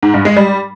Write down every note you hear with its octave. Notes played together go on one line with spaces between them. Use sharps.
G#2
G2
G#3
G3